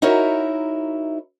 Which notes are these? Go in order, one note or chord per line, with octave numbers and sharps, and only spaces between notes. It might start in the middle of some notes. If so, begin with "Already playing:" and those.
D#4 E4 F#4 A#4 C#5 E5